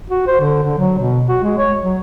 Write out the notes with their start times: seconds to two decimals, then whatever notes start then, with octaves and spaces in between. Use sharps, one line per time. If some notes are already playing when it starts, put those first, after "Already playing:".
0.10 F#4
0.27 C5
0.41 D3
0.63 D3
0.78 F#3
0.99 B2
1.28 F#4
1.43 G#3
1.58 C#5
1.82 F#3